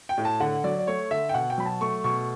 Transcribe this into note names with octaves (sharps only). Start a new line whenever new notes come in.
G5
A2
A5
D3 F#5
F#3 D5
D5
A3 C#5
D3 E5
G5
B2 F#5
G5
F#3 B5
A5
A3 C#6
B2 C#6